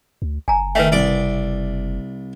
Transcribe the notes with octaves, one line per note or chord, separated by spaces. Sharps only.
D2
F#1 G#5 A#5
D#3 A3 B4 E5 G5
C2 D5 D6